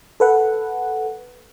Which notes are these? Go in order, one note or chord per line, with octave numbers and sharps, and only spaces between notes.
A4 B4 F#5